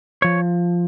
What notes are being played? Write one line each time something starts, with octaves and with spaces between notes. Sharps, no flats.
F3 C#5